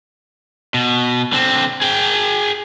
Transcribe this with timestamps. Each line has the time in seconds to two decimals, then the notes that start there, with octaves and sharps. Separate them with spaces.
0.74 B2
1.33 D3 C4
1.82 G#4 G5